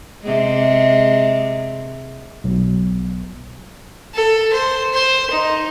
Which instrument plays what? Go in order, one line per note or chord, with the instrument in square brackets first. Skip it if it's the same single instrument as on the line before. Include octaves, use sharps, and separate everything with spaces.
[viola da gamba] C3 G#3
[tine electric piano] B1
[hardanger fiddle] A4
C5
C5
D#4